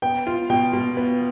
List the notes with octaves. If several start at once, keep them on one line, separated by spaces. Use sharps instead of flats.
B3 G5
F4
B2 G5
B2
B3